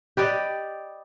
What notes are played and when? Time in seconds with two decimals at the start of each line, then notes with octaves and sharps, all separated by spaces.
0.17 G4 B4 D5 D#5